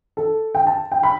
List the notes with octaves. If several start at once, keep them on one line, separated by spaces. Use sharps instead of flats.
A4
G5
A5
G5
B5